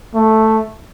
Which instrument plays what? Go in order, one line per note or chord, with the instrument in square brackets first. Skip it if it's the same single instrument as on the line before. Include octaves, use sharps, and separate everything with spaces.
[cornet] A3